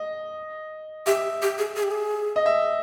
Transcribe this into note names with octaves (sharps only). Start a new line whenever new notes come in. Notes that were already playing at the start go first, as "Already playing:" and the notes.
Already playing: D#5
G4 E5
G4
G#4
G#4
G4
G#4
D#5
E5